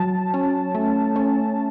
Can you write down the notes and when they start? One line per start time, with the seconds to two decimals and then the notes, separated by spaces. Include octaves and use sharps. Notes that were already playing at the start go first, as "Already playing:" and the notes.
Already playing: F#3 A5
0.34 C#4
0.75 A3
1.16 C#4